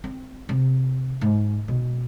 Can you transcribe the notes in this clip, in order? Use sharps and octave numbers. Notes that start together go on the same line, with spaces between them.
C4
C3
G#2
B2